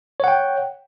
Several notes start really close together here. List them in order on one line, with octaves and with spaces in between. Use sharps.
C#5 F#5 G5